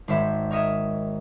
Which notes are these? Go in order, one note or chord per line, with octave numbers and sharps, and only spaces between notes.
G#1 C5 C#5 E5 B5
A#4 C#5 D#5 E5